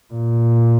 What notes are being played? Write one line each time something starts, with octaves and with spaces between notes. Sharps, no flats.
A#2